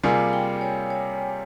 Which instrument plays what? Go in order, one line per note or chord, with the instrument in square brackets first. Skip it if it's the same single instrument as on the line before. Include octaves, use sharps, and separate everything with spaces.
[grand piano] C3 G3 A#3 F4 G#4 [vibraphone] G#5
[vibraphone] G5
C#5
C#5